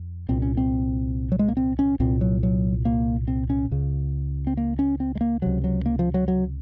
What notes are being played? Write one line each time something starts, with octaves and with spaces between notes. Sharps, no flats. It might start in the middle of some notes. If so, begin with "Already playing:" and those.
Already playing: F2
C2 A#2 C4
C#4
C4
F#3
G#3
A#3
C4
C#4
C2 A#2 C4
F#3
F#3
A#3
C4
C#4
C#2 C#3
C4
A#3
C#4
C4
G#3
A#3
C#2 C3 F#3
F#3
A#3
F3
F#3
F#3